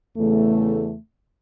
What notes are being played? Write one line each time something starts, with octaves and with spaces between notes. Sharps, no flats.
E2 C#3 A3